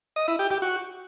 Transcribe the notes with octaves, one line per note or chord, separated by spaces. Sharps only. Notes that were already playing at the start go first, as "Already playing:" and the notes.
D#5
E4
G4
G4
F#4